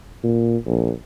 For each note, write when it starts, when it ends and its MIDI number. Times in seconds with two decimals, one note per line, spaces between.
0.24 0.57 46
0.67 0.92 34